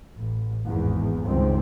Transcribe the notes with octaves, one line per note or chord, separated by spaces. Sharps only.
A1
G#1 E2
C#2 G2 D#3 C4